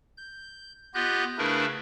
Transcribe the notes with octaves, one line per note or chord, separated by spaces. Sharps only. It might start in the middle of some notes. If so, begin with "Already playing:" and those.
G6
B3 F4 G4 D#5 F#6 G6
C#3 A3 D4 E4 A#4 B4